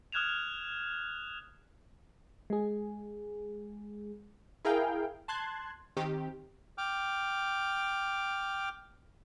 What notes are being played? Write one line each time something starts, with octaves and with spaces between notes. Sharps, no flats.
D#6 F6 F#6 G#6 E7 F7
G#3 G#4
E4 G#4 A#4 F5 G5
A5 C6 F#6 G#6
D#3 C4 G4
G5 D6 F6